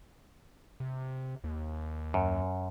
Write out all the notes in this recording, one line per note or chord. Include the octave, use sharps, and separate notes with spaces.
C3
D#2
F#2